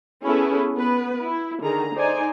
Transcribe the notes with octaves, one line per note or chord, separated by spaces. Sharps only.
B3 C#4 E4 G#4 A4 B4
B3 B4
E4
D3 D#3 G#4 A#5
D#4 C5 D5 G#5